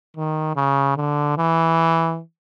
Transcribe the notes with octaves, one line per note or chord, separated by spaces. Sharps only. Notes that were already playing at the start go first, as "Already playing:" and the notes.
D#3
C#3
D3
E3